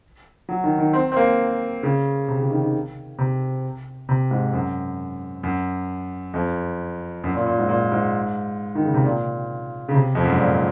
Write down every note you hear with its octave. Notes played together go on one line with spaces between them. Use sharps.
F#3
D#3
D#3
C4
C4
A#3
C#3
C3
C#3
D#3
D#3
C3
C3
G#2
F#2
F#2
F2
F#2
A#2
A#2
G#2
A#2
G#2
D#3
C#3
C3
A#2
C#3
C3
F2
F#2
G#2
A#2